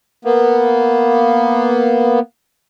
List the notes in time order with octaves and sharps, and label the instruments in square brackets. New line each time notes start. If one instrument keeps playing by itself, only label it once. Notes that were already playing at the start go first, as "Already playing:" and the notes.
[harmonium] A#3 B3